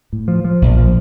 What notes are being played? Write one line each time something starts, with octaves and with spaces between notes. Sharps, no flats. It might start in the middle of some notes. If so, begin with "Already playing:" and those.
A2
F3
F3
A#1
F3